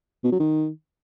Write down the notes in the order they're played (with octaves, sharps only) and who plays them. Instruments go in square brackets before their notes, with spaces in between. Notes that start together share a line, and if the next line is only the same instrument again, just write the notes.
[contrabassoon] B2
F#3
D#3